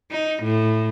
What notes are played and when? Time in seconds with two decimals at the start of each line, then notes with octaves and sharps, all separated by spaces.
0.11 D#4
0.43 A2